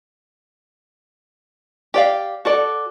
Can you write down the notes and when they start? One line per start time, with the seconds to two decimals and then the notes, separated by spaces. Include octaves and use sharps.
1.94 G4 D5 F5
2.45 F#4 A4 D5